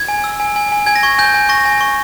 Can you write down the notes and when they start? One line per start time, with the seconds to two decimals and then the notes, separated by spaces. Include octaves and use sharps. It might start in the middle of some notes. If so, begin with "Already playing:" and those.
Already playing: G#6
0.08 G#5
0.24 E6
0.40 G#5
0.56 G#5
0.72 G#5
0.86 G#5 G#6
0.96 A#6
1.03 C#6 G#6
1.18 G#5 G6
1.34 G#5
1.49 C#6 A#6
1.65 G#5
1.81 C#6